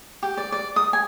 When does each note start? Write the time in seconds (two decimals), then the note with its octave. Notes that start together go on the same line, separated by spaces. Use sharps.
0.23 G4
0.37 D5
0.52 D5
0.76 D#6
0.93 G#5